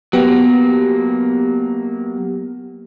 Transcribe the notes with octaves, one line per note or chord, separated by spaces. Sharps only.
F#3 A#3 B3 G4